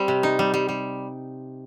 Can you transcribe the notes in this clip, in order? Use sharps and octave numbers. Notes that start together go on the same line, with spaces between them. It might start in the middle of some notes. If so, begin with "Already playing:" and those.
Already playing: G3 C4
C3
D#4
G3
G3
G3